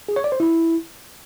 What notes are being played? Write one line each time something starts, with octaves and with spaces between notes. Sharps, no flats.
G#4
C#5
D5
C5
E4